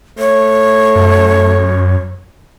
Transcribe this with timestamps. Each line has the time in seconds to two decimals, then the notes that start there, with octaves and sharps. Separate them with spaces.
0.19 A3 C#5
0.96 F#2